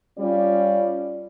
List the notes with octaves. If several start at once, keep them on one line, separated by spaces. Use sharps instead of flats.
G3 C#4 F4 D5